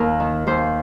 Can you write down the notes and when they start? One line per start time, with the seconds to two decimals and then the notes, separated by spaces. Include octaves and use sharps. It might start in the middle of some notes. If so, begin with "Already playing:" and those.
Already playing: D#2 A#4
0.20 D#3
0.47 D#2 C5